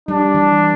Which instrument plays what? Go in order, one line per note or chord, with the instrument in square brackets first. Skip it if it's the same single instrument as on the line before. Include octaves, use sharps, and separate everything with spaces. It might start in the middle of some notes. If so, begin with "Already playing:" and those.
[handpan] G3 [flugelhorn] D4
[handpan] E3